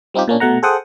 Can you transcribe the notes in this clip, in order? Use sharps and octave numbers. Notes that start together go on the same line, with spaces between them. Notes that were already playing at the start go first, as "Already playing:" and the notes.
G3 C4 D#4 F4 G4
A#2 A#3 C#4 D4
B2 A3 F#5 A#5
G#4 A4 C5 F#5 G5 D#6